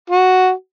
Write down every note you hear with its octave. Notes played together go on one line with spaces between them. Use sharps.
F#4